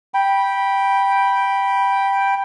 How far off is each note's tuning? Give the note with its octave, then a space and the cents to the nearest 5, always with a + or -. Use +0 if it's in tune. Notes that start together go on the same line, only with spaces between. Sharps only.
G5 +0 B5 -15